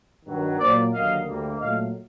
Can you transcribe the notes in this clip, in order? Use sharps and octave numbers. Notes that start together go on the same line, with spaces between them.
G2 D#3 F#3
A#2 F#3 A#3 C5 D5
D#2 D3 F#3 A#3 D#5 F5
D2 D3 G3 A#3
A#2 F#3 A3 D#5 F5